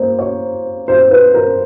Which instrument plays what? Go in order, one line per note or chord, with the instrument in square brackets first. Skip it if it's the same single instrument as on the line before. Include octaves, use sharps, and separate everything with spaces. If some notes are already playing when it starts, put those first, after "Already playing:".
Already playing: [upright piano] A#3 C5
C#5
C5
B4
A#4